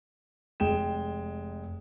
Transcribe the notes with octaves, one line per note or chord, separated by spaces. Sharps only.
F1 G#3 G5 E7